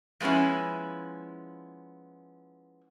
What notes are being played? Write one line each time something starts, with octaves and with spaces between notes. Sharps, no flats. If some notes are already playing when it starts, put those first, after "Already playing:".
F3 G#3 B3 C#4 E4